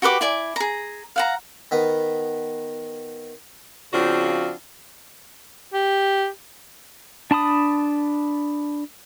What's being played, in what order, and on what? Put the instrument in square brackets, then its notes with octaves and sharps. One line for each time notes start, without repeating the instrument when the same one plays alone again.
[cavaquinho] F#4 G4 B4 D6
E4 D5 G#5
G#4 A#5
F5 F#5 A#5
[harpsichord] D#3 B3
[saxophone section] C#3 F3 C4 D4 F4 F#4
[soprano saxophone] G4
[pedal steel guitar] D4 A5 B5 D#6